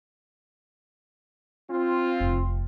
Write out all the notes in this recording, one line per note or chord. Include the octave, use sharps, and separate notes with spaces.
C4 F4
F1